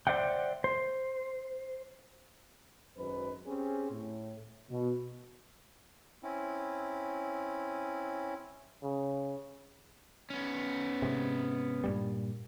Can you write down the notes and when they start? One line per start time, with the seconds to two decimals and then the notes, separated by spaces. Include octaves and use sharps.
0.07 C5 D5 E5 F#5 G5
0.64 C5
2.97 G#1 F#2 D#4 B4 C5
3.46 C4 C#4 G4 G#4
3.91 A2
4.70 B2
6.23 C4 C#4 E4
8.82 C#3
10.30 B3 C#4
11.02 G#2 C3
11.84 G2 A#2 G3